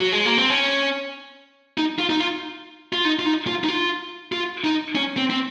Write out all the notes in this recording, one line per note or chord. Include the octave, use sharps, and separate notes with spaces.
F#3
G#3
A#3
C4
C#4
D#4
F4
D#4
F4
F4
D#4
F4
D#4
F4
D#4
F4
F4
D#4
C#4
C4
C4